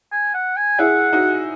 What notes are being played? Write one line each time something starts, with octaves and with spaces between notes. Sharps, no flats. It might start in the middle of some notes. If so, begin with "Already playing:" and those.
G#5
F#5
G#5
E4 G#4 F#5
D#4 F#4